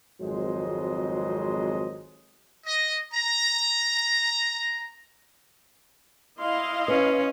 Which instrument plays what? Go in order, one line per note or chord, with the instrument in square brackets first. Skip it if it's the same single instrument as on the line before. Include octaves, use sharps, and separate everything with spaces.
[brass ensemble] G#1 F2 F#3 G#3 C5 D#5
[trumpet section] D#5
A#5
[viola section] E4 D#5 F5 [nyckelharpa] C6
[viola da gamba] C#4 [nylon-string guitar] B4